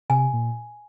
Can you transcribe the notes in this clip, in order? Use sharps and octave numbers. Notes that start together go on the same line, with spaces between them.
C3 G#5
A#2